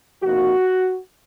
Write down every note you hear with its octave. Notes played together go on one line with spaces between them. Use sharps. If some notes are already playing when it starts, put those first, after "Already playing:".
C3 F3 A#3 D#4 F#4